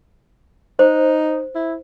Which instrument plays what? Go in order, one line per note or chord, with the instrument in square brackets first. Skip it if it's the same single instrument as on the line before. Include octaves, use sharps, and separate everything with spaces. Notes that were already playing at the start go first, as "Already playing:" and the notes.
[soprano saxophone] D#4 [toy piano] C5
[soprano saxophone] E4